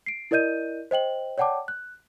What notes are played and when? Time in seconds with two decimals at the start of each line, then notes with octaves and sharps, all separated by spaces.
0.06 C7 D7
0.31 E4 A#4 D5 D#5 G6 D#7
0.91 C5 D#5 G5 F#7
1.38 C#5 D5 F#5 G5 A5 D6
1.68 F#6